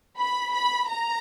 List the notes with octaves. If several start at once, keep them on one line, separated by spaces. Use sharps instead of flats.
B5
B5
A#5